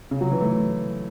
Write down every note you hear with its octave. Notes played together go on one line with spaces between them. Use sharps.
C#3
F#3
E3
A3